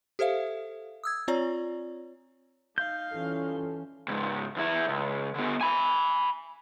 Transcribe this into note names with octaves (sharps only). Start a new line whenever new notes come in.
G4 A4 C5 E5 F5
D#6 E6 G#6
C4 F4 C#5 D5 A#5
D#4 F5 G6
E3 G3 C#4 F4 A4
C#2 G#2
E2 E4
C#2
D3 B3
G#5 B5